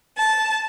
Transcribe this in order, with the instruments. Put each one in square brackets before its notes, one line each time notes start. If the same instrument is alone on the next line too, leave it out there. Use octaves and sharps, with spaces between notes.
[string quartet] A5